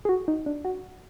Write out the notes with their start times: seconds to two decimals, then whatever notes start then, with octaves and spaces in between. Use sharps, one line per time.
0.05 G#4
0.09 F#4
0.28 D#4
0.46 D4
0.65 F#4